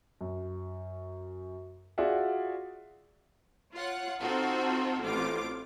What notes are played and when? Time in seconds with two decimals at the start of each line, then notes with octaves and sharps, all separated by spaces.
0.21 F#2
1.98 F4 F#4 G#4 D5 E5 F#5
3.73 F4 C#5 F#5
4.20 C4 D#4 F4 F#4 A4
5.03 A1 C4 F4 D6